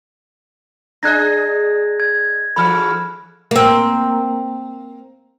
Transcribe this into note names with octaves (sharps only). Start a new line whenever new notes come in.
D4 G#4 D#5 F#6 G#6 A#6
G#6
G#2 E3 A4 B5 F6
A#3 C4